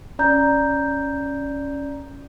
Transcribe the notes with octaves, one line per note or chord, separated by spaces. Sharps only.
C#4 D5 A#5 G6